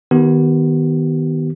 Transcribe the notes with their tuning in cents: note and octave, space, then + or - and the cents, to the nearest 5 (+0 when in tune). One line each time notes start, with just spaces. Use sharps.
D#3 +10 B3 +0 G4 -40